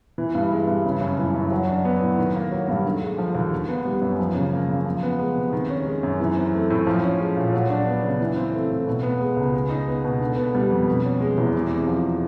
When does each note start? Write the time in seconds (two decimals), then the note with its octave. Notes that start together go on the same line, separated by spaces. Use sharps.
0.18 E3
0.35 G2
0.52 G#3
0.67 G2
0.85 C#3
1.01 F#2
1.19 E3
1.34 F#2
1.51 F#3
1.68 D4
1.85 B3
2.02 A2
2.18 D#3
2.36 A#3
2.52 F#3
2.68 G2
2.85 D3
3.02 G#3
3.18 F3
3.35 D#2
3.51 D#3
3.68 B3
3.85 G3
4.02 F#2
4.19 F3
4.35 C#3
4.53 A#3
4.69 C#3
4.85 F3
5.03 B3
5.19 G#3
5.36 C3
5.53 D#3
5.70 C#4
5.85 G#3
6.03 F#2
6.20 E3
6.36 C4
6.54 A3
6.70 A2
6.87 F3
7.03 C#4
7.20 G#3
7.36 A#2
7.53 F#3
7.70 D4
7.87 B3
8.04 C#3
8.20 E3
8.37 C4
8.53 A3
8.70 A2
8.87 B2
9.03 B3
9.21 G#3
9.37 C#2
9.53 G#3
9.70 D#4
9.88 B3
10.04 B2
10.21 D3
10.37 B3
10.55 G3
10.71 F2
10.88 B2
11.05 C#4
11.21 G#3
11.38 E2
11.55 C3
11.72 G#3
11.87 F3